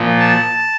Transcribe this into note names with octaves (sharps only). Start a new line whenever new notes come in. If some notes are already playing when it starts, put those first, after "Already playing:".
Already playing: A#2 F3
A5